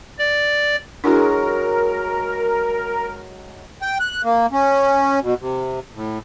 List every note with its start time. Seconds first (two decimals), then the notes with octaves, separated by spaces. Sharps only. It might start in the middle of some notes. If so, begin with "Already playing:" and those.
0.18 D5
1.04 F#3 G#3 D4 E4 F#4 A#4
3.82 G5
4.00 F#6
4.24 A#3
4.52 C#4
5.23 B2
5.41 C3
5.95 A2